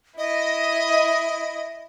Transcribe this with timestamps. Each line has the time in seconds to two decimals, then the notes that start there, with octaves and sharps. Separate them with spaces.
0.18 E4 D#5